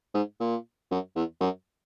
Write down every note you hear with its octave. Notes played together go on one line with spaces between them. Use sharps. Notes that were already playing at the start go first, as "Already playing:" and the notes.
G#2
A#2
F#2
E2
F#2